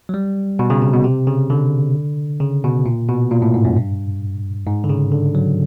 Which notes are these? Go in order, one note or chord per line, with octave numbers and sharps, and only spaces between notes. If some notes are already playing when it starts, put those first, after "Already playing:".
F#3
G3
B2
C#3
C3
B2
C3
C#3
D3
C#3
B2
A#2
B2
A#2
A2
G#2
F#2
G2
G#2
D3
C#3
D3
F#3